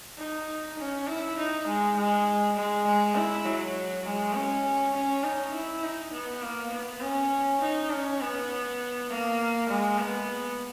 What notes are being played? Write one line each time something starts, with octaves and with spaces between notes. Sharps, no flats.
D#4
C#4
E4
D#4
G#3
G#3
G#3
G#3
E4
F#3
G#3
C#4
C#4
D#4
E4
D#4
B3
A#3
B3
C#4
D#4
C#4
B3
A#3
G#3
B3